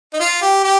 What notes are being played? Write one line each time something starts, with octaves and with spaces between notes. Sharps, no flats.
D#4
F4
G4
G4